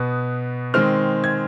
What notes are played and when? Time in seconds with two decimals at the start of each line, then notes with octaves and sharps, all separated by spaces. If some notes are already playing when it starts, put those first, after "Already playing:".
Already playing: B2 B3 D#6
0.74 D#3 G#3 C4 F6
1.24 G#6